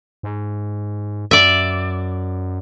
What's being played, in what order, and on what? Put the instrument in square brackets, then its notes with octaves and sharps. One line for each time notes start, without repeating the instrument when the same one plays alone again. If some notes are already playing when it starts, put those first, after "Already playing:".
[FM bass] G#2
[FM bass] F#2 [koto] D5 E5